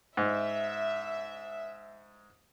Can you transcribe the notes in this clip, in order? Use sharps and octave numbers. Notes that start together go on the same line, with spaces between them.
G#2 E5